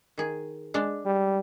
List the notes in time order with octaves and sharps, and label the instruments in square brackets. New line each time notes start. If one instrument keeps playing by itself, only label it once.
[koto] D#3 G#4
G#3 D4
[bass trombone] G3